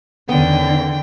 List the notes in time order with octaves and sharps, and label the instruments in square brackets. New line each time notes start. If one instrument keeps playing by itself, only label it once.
[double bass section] E2 D#3 C#4 [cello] D3 [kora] B3 [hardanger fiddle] G5